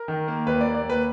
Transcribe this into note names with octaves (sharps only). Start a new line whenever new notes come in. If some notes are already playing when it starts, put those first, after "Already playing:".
Already playing: A#4
D#3
A#3
D#2 B4
D5
A#3
D5
D#2 B4